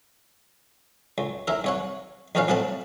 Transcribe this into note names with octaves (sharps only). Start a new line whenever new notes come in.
C#2
D#2 E4 A#4 E5
C2 C#5 F#5
A#1 E2 B2 C#4 B4 F5
C2 A2 C4 F#5 A5 B5